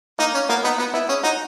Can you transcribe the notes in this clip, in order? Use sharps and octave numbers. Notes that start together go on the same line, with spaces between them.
A#3 D#4
C#4
A#3 B3
B3 D#4
B3 F#4
B3 E4
C#4 G#4
D#4 F#4